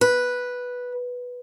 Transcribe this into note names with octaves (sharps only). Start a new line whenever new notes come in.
B4